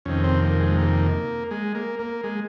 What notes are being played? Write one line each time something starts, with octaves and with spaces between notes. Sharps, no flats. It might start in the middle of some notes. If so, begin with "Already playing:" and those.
F2 C3 D#3 C#4
C4
A#3
G#3
A#3
G#3
A#3
A#3
G#3